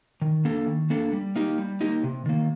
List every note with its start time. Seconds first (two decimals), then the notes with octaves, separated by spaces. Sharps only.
0.22 D#3
0.45 A#3 D4 A4
0.67 D#3
0.90 A#3 D4 A4
1.13 G3
1.36 A#3 D#4 G4
1.58 G3
1.81 A#3 D#4 G4
2.03 C3
2.26 D#3 A#3